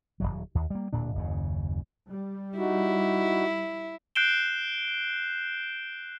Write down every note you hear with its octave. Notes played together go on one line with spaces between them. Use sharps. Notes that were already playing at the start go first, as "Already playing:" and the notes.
D#1 A#1 F#3
D#2
G3 A#3
D1 A#2 D4
F#1 D#2 C#3
G3
D#4 E4 F#4
F#6 G6 C7 D7 E7 G7